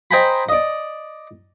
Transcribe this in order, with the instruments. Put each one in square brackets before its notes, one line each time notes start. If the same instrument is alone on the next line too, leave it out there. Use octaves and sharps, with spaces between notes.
[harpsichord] C5 D#5 G5 G#5 A#5 B5
D5 D#5